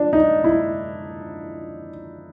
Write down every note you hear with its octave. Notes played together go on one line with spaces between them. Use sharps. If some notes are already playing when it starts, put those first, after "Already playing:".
Already playing: F3 D4
D#4
E4